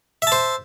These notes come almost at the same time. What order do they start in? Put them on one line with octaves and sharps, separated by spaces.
E5 A5 C5